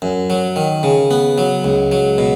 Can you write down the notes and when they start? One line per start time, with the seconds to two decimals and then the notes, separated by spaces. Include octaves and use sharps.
0.02 F#2
0.30 F#3
0.56 D#3
0.83 C#3
1.11 B3
1.38 F#3
1.64 C#2
1.92 F#3
2.18 B2